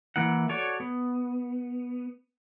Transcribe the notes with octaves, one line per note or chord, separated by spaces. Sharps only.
E3 A#3 E4 F#5
F#4 A4 C#5 D5
B3